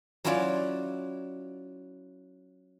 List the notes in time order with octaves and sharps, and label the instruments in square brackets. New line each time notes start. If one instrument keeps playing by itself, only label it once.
[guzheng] F#3 C#4 E4 F4 C#5 D5